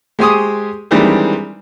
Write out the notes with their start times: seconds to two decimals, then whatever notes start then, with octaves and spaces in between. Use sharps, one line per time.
0.19 G#3 G4 C5 G#5 C#6 D#6
0.91 D#3 E3 G3 G#3 C4 D4